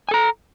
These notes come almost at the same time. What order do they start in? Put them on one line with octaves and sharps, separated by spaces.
G#5 A4 A#5